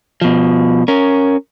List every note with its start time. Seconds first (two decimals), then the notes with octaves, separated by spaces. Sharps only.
0.21 B2 F3
0.88 C#4 A#4